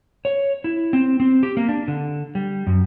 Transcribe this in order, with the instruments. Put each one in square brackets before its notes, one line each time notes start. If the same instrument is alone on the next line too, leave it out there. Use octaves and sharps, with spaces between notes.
[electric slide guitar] C#5
E4
C4
C4
G4
A#3
D4
D3
G3
F#2